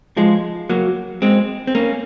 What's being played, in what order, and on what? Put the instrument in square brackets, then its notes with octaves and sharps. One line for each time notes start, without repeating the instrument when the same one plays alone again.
[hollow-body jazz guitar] F3 G#3
F#3 A#3
G#3 C4
C4
A#3 C#4